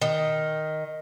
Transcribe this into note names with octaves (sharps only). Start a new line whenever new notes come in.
D#3